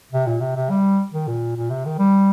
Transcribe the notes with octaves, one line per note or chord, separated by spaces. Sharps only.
C3
A#2
C3
C3
G3
D#3
A#2
A#2
C3
D#3
G3